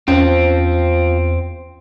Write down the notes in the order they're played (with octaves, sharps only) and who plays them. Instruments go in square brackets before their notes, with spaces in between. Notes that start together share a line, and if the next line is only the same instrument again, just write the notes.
[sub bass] E2 [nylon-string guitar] F3 [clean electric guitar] C4 [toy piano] C#4 C5